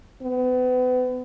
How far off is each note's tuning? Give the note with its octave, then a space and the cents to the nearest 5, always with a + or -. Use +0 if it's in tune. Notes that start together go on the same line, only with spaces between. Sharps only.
B3 +35